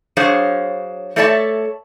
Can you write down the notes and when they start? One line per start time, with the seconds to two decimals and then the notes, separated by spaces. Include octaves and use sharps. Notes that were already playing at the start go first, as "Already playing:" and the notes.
0.17 F#3 D4 G#4 C5 C#5 F5
1.16 A3 A4 C#5 D5 E5 A5